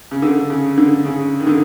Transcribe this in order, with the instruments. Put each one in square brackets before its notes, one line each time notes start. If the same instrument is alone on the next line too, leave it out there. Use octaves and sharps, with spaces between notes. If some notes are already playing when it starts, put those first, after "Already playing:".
[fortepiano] C#3
D3
C#3
D3
C#3
D#3
D3